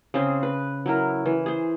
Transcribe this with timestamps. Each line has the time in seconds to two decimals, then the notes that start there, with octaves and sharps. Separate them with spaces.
0.14 C#3 C4 G#4 C5
0.43 B4
0.86 F#3 E4 A#4
1.26 E3
1.46 G#4 C5